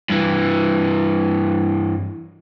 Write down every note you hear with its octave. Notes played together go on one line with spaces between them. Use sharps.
G2 E3